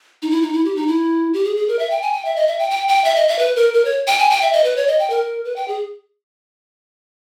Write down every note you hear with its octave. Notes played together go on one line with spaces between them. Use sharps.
D#4
E4
D#4
E4
G4
D#4
E4
G4
G#4
G#4
A#4
E5
G5
G#5
G5
E5
D#5
E5
G5
G5
G5
E5
D#5
E5
B4
A#4
A#4
C#5
G5
G#5
G5
E5
D#5
B4
C#5
D#5
G5
A#4
B4
G5
G#4